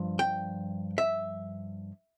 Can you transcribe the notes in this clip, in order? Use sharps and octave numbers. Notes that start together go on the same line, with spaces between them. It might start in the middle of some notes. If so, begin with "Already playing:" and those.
Already playing: G2 F3
G5
E5